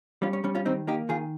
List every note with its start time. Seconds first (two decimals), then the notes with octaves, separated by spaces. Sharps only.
0.22 G3 C#4 F4
0.33 C#4
0.44 G3 C#4
0.55 C#4 F4
0.65 D#3 C4 D#4
0.87 A#3 D#4 G4
1.09 D#3 F4 G#4